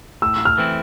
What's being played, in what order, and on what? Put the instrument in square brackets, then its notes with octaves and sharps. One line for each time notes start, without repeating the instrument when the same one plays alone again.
[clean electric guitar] A2 [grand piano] E6
[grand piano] F6
[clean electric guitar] E3 A3 C4 E4